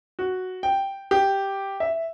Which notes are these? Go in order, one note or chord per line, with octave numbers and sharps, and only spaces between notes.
F#4
G5
G4
E5